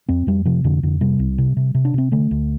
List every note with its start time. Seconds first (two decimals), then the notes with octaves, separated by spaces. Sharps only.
0.09 F2 C4
0.27 F2 G3
0.45 C3 F3
0.64 F2 D3
0.83 F2 D3
1.01 C3 G3
1.19 C2
1.38 C3
1.57 C3
1.75 C3
1.85 D4
1.94 C3 C4
2.12 D3 A3
2.31 D2